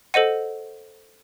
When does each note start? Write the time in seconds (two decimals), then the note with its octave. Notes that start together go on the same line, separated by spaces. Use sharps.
0.14 A4 C5 D#5 F#5 D#7